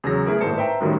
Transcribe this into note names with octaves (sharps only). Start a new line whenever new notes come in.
E2 C#3 F#3 A#6
A3 B3 E4 G#4 A#4
G#1 A2 A#3 C5 A5 C#7
B4 C5 E5 G5 A#5
F#2 A2 D#3 F#3 G3